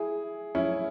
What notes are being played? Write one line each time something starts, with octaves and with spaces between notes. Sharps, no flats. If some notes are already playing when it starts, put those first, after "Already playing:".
Already playing: E4 G#4
C#4 E4